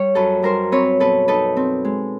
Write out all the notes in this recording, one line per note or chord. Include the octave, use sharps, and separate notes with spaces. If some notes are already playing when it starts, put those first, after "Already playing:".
Already playing: G3 C#5
F#2 A4 B4
G3 A#4 C5
C4 B4 C#5
B2 A4 B4
D#4 A4 B4
C4
G#3